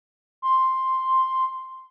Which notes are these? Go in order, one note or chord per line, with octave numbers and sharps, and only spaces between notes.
C6